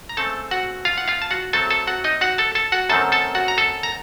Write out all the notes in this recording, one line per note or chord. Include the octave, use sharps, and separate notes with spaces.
A#5
C#3 A3 C4 A4 A5
F#4 F#5
F4 F5
F#5
F4 F5
A5
F#4 F#5
A2 F#3 C4 A4 A5
A4 A5
F#4 F#5
D#4 D#5
F#4 F#5
A4 A5
A4 A5
F#4 F#5
F#2 D#3 A3 C4 A4 A5
A4 A5
F#4 F#5
A#5
A4 A5
A#5